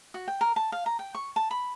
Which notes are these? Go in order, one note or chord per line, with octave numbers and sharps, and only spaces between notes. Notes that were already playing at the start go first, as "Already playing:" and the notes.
F#4
G5
A#4
A5
F5
A#5
G5
C#6
A5
B5